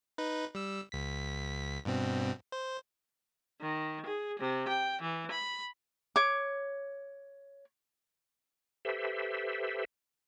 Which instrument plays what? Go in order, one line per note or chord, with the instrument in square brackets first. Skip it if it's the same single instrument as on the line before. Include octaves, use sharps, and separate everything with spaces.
[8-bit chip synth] D#4 B4
G3 E6
C#2 B6
G2 B2 C4
C5
[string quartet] D#3
G#4
C3
G5
E3
B5
[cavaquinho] C#5 D6
[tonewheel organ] G4 A4 B4 C5 E5